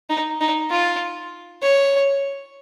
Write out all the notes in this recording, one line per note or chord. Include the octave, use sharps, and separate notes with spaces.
D#4
D#4
F4
C#5